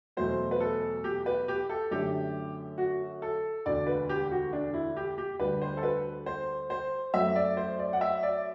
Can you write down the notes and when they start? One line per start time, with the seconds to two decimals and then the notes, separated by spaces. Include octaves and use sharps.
0.17 E2 B2 F#3 A3 C5
0.51 B4
0.60 A4
1.04 G4
1.26 B4
1.48 G4
1.70 A4
1.91 F#2 D3 A3 G4
2.78 F#4
3.22 A4
3.65 E1 D2 D3 D5
3.87 B4
4.09 G4
4.31 F#4
4.53 D4
4.74 E4
4.96 G4
5.18 G4
5.39 D2 D3 G3 B4
5.61 C5
5.77 A4
5.83 B4
6.26 C5
6.70 C5
7.14 F#2 F#3 A3 E5
7.35 D5
7.57 C5
7.79 D5
7.93 F#5
8.01 E5
8.23 D5